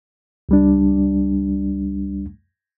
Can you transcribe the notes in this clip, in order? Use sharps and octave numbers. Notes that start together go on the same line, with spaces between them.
C#2 G3 D4